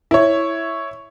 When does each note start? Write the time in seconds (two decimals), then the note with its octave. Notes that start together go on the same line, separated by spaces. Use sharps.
0.11 E4 C#5